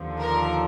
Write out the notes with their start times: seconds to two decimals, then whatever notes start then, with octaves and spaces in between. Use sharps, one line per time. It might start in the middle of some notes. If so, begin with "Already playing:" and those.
Already playing: D#2 D3 F3
0.20 A#4